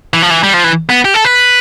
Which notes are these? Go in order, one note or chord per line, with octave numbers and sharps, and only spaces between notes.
E3
F3
E3
G3
F3
E3
B3
G4
A4
B4